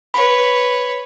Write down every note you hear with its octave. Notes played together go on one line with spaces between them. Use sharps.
B4 C#5 B5